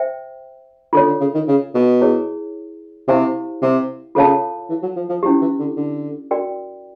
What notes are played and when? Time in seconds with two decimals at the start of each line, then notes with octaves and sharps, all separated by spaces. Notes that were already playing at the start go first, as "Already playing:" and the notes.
Already playing: C5 E5 G5
0.93 D3 F4 A4 C#5
1.07 D3
1.20 C#3
1.34 D#3
1.48 C#3
1.74 B2
2.01 E4 G#4 C#5
3.08 C3 E4 G4 C5 F5 G#5
3.62 C3
4.15 C#3 F4 A4 C#5 F5 A5
4.69 E3
4.82 F#3
4.96 F3
5.09 F3
5.23 F3 C#4 E4 G4
5.41 E3
5.59 D3
5.76 D3
6.31 F#4 A#4 D5 G5